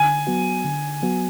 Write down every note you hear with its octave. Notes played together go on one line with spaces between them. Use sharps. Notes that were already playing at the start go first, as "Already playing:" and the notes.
Already playing: D3 G#5
F#3 B3 F#4
D3
F#3 B3 F#4